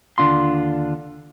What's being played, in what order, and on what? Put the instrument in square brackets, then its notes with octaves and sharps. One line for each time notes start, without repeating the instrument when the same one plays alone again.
[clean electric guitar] D#2 D3 D4 F4 C6